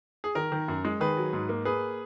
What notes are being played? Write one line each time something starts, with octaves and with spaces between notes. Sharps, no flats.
G#4
D#3 A#4
D#3
F#2
G#3
D#3 G#4 B4
F#3
G#2
A#3
A#3 G#4 B4